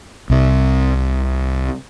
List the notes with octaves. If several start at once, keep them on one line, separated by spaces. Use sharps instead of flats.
C2 C3